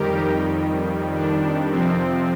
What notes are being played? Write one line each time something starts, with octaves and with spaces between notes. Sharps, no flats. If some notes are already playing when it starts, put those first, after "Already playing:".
Already playing: F2 D#3 G3 G4 A#4
D4
F2 C3 F3 C4